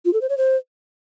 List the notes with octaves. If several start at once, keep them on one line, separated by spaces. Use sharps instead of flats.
F4
A4
C5
C#5
C5